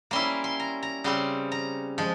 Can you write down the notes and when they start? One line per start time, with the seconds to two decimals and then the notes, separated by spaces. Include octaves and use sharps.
0.11 G3 A#3 C#4 E4 C6
0.44 C6
0.60 A#5
0.83 A#5
1.04 C#3 G3 C4 C6
1.52 A#5
1.98 F3 G#3